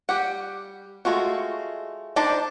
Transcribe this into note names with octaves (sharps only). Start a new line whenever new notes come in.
G3 G4 F#5
G#3 A3 F4 F#4
D4 D#4 C5 D5 A5